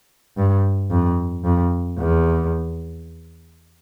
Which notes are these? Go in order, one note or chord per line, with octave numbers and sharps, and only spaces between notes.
G2
F2
F2
E2